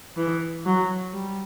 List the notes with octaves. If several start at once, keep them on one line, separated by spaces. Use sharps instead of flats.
E3
F#3
G3